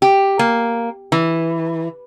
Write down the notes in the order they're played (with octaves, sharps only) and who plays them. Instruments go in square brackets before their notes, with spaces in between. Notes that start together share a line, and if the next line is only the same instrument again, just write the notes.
[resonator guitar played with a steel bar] G4
A#3
E3